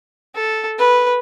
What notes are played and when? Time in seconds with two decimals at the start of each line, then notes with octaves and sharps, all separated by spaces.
0.35 A4
0.79 B4